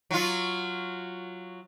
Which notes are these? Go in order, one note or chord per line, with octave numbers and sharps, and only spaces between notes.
F#3 F4